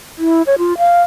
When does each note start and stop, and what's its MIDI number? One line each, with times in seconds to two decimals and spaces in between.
0.18 0.42 64
0.47 0.55 73
0.58 0.77 65
0.78 1.02 77